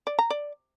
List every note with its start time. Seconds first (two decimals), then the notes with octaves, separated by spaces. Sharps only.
0.07 D5
0.19 A#5
0.30 D5